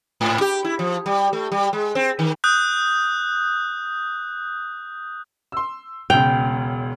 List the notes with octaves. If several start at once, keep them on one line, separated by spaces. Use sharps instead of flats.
G#2
G4
E4
F3
G3
A3
G3
G#3
C4
D#3
D#6 F#6 G6
C6 E6
E1 C#2 G5 F7